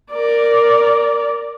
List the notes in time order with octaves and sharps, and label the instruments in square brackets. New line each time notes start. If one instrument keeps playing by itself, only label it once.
[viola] A#4 D5